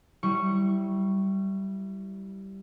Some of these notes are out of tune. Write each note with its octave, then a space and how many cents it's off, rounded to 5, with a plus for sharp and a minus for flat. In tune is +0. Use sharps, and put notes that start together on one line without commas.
G3 -15 E4 +0 C#6 +0